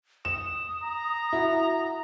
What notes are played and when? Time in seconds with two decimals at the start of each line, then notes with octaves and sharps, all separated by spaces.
0.25 D#6 E7
0.83 A#5
1.33 E4 F#4